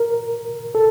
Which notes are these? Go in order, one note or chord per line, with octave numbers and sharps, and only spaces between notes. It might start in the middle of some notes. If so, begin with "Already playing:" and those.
Already playing: A#4
A4